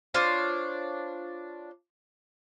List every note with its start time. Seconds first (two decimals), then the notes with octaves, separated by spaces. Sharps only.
0.14 D4 F4 C5 C#5